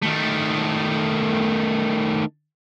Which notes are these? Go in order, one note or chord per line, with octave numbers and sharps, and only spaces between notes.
D#3 A3